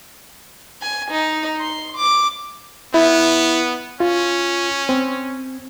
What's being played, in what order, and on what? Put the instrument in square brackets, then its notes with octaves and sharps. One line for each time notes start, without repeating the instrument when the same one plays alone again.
[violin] G#5
D#4
C6
D6
[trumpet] B3 [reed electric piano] E4
[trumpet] C#4 [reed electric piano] F4
[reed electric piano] C4